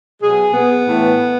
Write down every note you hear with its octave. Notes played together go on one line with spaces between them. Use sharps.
B2 F#3 G#4
B3
A2 E3